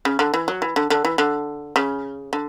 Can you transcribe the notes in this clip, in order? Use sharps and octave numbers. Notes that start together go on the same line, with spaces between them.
C#3
D3
E3
F#3
E3
D3
D3
E3
D3
C#3
D3